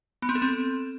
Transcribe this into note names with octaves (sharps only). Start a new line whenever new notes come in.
B3
C4
A4
C4